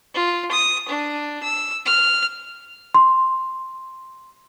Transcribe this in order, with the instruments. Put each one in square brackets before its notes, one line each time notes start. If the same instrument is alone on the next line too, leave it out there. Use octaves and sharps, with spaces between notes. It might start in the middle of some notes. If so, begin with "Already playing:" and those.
[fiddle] F4
D#6
D4
E6
F6
[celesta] C6